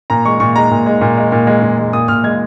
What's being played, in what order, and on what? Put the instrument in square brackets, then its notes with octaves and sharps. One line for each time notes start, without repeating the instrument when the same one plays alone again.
[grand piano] A#2 A#5
G#3 C#6
A#2 C#6
G#3 A#5
A#2
G#3
A#2
G#3
A#2
G#3
A#2
G#3
A#2 D#6
A#2 F6
G#3 G#6